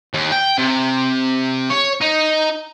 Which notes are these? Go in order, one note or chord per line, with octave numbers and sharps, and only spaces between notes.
D#2
G5
C3
C#5
D#4